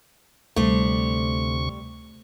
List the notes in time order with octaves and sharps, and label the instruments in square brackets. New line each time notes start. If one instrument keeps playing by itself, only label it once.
[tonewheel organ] D2 C3 C#6 [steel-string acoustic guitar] G3 C5 [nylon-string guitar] A3